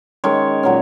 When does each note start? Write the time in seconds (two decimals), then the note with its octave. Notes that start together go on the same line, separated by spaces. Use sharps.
0.24 D#3 G#3 C#4 C#5
0.63 A#2 F#3 C#4